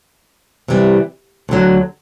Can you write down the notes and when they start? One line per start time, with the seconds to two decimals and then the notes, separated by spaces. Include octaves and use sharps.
0.68 C3 E3 G3
1.49 D2 D3 F#3